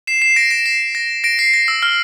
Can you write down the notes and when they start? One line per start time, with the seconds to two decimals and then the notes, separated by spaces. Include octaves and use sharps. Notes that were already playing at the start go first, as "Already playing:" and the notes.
0.07 C7 E7
0.22 C7 E7
0.36 A#6 D7
0.50 A#6 D7
0.66 C7
0.95 A#6
1.24 A#6 D7
1.39 C7
1.54 A#6
1.68 E6
1.83 F6